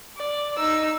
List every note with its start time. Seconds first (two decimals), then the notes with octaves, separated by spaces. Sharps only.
0.17 D5
0.57 D#4 E6